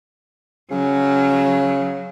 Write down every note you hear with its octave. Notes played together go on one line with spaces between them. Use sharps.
C#3 F#3